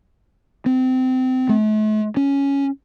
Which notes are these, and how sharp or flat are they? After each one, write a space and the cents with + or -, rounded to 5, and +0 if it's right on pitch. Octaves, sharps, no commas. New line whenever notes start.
C4 -25
A3 -45
C#4 +5